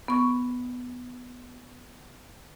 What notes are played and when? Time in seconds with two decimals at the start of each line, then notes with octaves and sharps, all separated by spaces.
0.08 B3 C#6